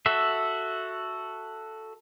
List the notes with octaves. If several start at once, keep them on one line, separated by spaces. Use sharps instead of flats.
F#4 A4 E5